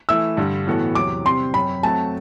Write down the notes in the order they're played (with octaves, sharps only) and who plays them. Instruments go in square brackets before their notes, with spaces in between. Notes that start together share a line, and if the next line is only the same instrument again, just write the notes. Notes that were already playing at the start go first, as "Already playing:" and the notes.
[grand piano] E3 A3 E4 [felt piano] E6
[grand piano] G2 D3 G3
A2 E3 B3 F#4 A4
[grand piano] E2 C3 F#3 [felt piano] D6
[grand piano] C3 G3 C4 G4 [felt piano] C6
[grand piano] F#2 F#3 C4 [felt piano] B5
[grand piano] F#3 A3 C4 F#4 [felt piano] A5